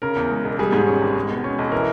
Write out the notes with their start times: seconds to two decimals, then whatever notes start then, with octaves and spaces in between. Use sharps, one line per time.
0.02 C#3 A#4
0.16 E2
0.31 G#3
0.45 E1
0.59 G3 G#4
0.72 G#2
0.87 C#4
1.02 G#1
1.16 G#3
1.29 B2
1.44 C#4
1.58 B1
1.72 E3 A#4